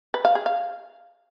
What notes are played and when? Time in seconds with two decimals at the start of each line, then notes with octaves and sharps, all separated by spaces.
0.14 B4
0.25 F5
0.35 G#4
0.46 F5